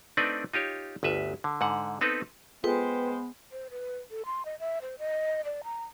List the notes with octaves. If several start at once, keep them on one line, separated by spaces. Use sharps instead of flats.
A3 C4 D4 D#4 B4 D5
D#4 F4 G4 C#5
G1 D2 B4 E5
D3
G#2 D3 F#5
B3 C4 D#4 A4 B4
G#3 B3 F4 G#4 A4 B4 C5 G5
C5
B4
A4
C6
D#5
E5
C5
D#5
D5
A#5